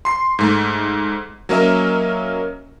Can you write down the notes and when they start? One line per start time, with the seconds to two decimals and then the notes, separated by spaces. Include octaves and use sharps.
0.05 C6 C7
0.39 G#2 A3
1.49 F#3 A#3 C#4 A#4 D#5 E5